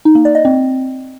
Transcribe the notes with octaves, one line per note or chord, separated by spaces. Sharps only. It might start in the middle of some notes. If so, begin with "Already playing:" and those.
D#4
A#3
D5
D#5
C4